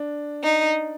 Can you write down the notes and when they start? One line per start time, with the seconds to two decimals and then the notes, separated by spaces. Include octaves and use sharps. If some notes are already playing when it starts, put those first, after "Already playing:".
Already playing: D4
0.44 D#4